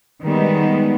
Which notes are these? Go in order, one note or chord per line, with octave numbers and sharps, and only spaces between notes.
D#3 G3 G#3 B3